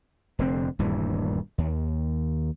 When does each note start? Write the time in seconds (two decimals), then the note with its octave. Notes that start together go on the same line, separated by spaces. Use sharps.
0.39 F1 D3 C4
0.79 D#1 D2 G2 E3
1.58 D#2